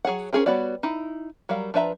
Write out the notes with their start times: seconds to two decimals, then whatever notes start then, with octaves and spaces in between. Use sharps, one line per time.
0.05 F#3 G#4 C#5 F#5
0.33 C#4 F4 G#4 A#4 C5
0.46 G3 B3 F#4 C#5 D5
0.83 D#4 E4
1.49 F#3 G3 A#4 F5
1.74 F3 D4 B4 E5 A#5